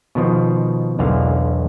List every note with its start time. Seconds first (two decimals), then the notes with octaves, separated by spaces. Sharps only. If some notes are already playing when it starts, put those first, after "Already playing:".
0.15 B2 D#3 F3
0.99 B1 E2 D3 A#3 F5